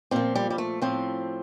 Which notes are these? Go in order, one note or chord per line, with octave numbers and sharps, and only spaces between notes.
A#2 F3 C4
G3
G3
A3
A2 F3 C4